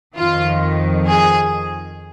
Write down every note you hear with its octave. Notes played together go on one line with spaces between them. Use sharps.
F2 D#3 F4
G#4